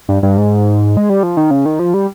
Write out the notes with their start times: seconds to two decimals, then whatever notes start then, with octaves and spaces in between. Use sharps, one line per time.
0.09 G2
0.23 G2
0.37 G#2
0.97 G#3
1.10 G3
1.23 F3
1.37 D#3
1.51 C#3
1.66 D#3
1.79 F3
1.94 G3